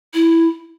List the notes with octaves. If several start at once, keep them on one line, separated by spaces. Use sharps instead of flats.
E4